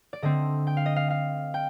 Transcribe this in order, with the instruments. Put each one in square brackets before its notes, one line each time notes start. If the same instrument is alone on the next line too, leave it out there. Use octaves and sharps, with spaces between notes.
[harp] D5
D3 A3 C4 D#5
G5
F5
D#5
F5
F5
G5